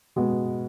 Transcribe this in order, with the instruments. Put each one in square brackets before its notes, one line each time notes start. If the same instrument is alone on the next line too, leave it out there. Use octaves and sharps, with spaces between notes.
[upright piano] B2 G#3 B3